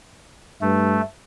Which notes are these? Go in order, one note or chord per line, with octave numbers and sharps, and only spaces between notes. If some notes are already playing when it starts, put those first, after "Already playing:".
G2 A3